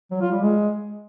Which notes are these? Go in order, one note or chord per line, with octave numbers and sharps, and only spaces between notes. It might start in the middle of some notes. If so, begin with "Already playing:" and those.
F#3
F4
G3
G#3